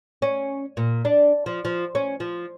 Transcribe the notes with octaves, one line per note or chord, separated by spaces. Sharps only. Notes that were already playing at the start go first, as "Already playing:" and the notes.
C#4
A#2
D4
F3
F3
C#4
F3